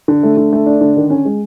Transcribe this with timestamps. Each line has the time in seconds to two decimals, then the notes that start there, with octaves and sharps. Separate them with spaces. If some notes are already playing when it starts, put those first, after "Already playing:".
0.08 D3
0.23 A3
0.37 D3
0.53 A3
0.66 D4
0.81 D3
0.97 D#3
1.10 C#4
1.25 G#3